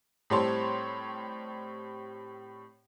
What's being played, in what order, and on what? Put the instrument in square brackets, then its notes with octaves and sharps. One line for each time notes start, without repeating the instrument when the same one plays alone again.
[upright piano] A2 G3 C4 C#5 A5 C6